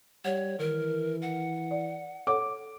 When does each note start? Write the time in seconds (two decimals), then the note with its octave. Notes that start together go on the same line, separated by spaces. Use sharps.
0.25 G3 C#5 F#5
0.59 D#3 E3 A#4
1.22 F#5
1.71 D5
2.27 A4 C#5 F#5 D6